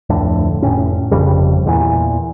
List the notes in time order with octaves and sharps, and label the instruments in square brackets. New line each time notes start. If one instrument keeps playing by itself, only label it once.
[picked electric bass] D1 F2 A2 D3
F1 A#1 A2 C#4
G1 F2 C#3 G3
E2 A#2 E3